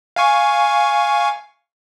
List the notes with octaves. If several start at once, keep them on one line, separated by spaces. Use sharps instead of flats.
F5 G#5 C#6